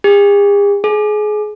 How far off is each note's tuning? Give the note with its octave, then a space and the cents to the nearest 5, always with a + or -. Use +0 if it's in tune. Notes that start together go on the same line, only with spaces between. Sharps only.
G#4 -45
G#4 +25